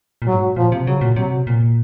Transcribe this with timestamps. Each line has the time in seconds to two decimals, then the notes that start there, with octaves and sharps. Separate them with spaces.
0.22 A#2
0.28 G#2 F#3
0.56 A#2 F3
0.72 C3
0.87 C#3 F#3
1.01 A#2
1.16 C3 F#3
1.47 A#2